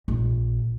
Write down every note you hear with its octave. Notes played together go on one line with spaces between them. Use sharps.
A#1